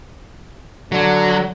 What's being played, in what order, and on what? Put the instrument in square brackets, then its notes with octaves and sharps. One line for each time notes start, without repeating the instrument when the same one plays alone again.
[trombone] D3 [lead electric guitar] F#3